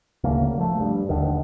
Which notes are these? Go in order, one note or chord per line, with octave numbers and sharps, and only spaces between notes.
D2 C#3 A#3
F3 A3
G2
D#2 D3 D#3